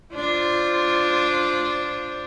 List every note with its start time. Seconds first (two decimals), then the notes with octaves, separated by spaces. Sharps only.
0.14 D4 F4 C5